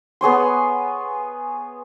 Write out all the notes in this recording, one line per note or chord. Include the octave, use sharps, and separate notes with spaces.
B3 G#4 C#5 C6